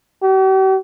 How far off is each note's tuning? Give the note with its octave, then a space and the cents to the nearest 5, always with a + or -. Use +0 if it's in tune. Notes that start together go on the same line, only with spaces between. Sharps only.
G4 -45